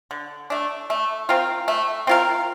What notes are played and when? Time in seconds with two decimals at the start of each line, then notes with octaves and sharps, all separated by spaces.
0.11 D3
0.50 A3 D4
0.90 A3
1.29 C4 F4 A#4
1.68 A3
2.07 C4 F4 A#4